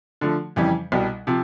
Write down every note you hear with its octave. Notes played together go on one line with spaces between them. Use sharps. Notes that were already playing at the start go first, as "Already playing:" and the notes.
D3 F3 A3
F2 C#3 E3 G3
C2 B2 G3
C3 F3